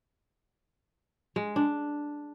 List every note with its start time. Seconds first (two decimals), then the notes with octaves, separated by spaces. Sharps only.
1.36 G#3
1.56 D4